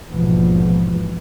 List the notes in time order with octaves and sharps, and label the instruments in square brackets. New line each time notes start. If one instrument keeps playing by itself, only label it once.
[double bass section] A#1 E2 G#2 B2 F3